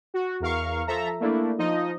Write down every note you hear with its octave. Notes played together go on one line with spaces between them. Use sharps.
F#4
E2 A#4 F5 C#6
F3 A4 E5 A#5
A3 A#3 D4 E4
F3 D#4 D#5